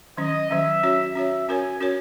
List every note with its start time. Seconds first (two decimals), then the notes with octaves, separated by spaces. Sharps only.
0.18 D#3 F#3 C#4 D#5
0.50 D#3 F#3 C#4 E5
0.83 C#4 F#4 C#5
1.15 C#4 F#4 C#5 E5
1.48 C#4 F#4 A#4 C#5 G#5
1.81 C#4 F#4 A#4 C#5